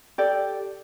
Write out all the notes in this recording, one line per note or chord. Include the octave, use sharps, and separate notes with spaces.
G4 A4 D5